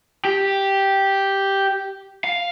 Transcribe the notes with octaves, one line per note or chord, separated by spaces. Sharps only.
G4
F5